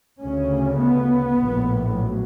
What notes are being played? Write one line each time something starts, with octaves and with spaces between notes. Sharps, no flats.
D2 C#3 C#4
B3
A#1 A2
F#3